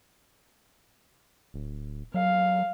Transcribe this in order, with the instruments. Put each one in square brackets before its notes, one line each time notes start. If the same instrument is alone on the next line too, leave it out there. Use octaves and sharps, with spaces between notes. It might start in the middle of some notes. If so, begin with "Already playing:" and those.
[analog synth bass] D1
[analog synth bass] F#3 [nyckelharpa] F5